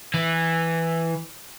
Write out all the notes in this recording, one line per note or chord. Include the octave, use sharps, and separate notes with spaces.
E3